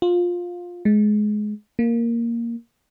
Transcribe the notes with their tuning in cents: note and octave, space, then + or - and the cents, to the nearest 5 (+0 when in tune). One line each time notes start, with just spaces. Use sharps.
F4 +15
G#3 +20
A#3 +0